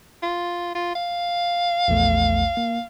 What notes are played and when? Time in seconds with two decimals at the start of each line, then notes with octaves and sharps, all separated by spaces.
0.22 F4
0.75 F4
0.95 F5
1.88 A#1 E2 A3
2.57 A#3